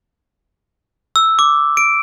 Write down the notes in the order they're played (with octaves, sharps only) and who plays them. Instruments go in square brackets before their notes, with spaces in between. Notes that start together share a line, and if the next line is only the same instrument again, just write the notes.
[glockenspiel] E6
D6
D7